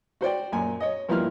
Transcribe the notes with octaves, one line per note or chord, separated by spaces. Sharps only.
F#4 C5 D5 G5
F#2 A#2 G#5
C#5 D#5
G2 F3 A#3 E4 F6